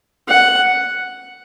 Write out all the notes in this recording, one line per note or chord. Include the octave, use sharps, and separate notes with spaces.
F#5